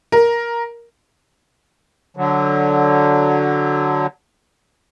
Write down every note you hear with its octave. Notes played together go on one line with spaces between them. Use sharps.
A#4
D3 F#3